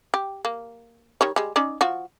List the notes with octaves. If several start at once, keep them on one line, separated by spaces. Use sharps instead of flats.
G4
A#3
D#3 G3 C#5
G3 G#3
C#4 D#4 D5
F3 F4 F#4